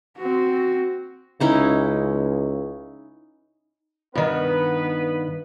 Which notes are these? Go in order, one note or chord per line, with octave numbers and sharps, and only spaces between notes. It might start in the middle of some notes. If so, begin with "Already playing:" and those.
C4 F#4
C#2 C#4 D#4 E4
G2 D#3 B3 B4